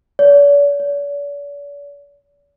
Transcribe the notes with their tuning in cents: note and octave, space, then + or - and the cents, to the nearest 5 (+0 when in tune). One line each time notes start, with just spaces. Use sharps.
D5 -45
D5 -45